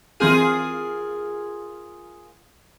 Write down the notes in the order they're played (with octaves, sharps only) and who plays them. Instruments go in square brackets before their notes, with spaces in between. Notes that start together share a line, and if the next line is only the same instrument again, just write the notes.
[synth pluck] E3 C4 D#7 [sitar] F4 G#4 A#4